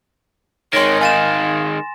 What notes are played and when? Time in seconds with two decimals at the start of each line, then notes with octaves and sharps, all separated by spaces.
0.73 D#3 G#3 C#5 C6 A#6
1.01 F5 G#5 A6 E7